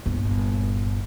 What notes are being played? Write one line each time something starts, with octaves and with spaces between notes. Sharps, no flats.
G1 A#2